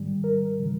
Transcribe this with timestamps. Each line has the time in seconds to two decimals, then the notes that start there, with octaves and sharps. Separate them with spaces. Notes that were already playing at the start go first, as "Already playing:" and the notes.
Already playing: G#2 D#3 G3
0.24 A#4
0.59 C#3 E3 G3